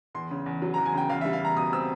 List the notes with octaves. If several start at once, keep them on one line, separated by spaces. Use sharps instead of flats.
E2 C6
C#3
E2
F#3
A#5
E2
G#5
C#3 G5
E2 F5
E5
G3
F5
E2 A#5
B2 D#6
C4 E6